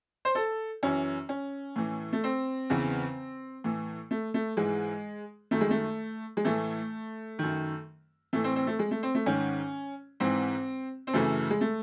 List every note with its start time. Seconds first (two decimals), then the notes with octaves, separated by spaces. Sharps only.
0.25 C5
0.35 A4
0.83 F#2 E3 C#4
1.29 C#4
1.76 A2 E3
2.13 A3
2.24 C4
2.70 E2 C#3 E3
3.64 A2 E3
4.11 A3
4.34 A3
4.57 G#2 E3 G#3
5.51 F#2 D#3 A3
5.61 G#3
5.70 A3
6.37 G#3
6.44 A2 E3 A3
7.39 F#2 D#3
8.33 A2 E3 A3
8.44 C4
8.56 C4
8.67 A3
8.79 G#3
8.91 A3
9.03 C4
9.15 A3
9.26 G#2 D#3 C#4
10.20 G#2 E3 C4
11.07 C4
11.13 F#2 C#3 E3 A3
11.50 G#3
11.61 A3